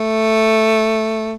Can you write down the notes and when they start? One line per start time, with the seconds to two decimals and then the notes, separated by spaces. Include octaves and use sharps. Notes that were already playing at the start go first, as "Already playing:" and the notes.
Already playing: A3